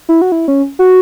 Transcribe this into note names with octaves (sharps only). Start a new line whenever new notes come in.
E4
F#4
E4
C#4
F#4